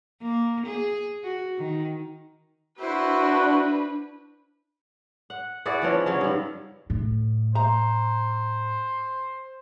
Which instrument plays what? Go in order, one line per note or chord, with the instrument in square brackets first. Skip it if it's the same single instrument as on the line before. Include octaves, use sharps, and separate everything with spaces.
[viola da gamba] A#3
G#4
F#4
D#3
[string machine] D4 [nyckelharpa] E4 C5 [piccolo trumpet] F#4 [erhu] B4
[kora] F#5
E4 F#4 G#4 D5
E3 F3 C#4 D4
C#3 F#3 C#4
G2 D#3
[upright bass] A2
[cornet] C5 [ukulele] A#5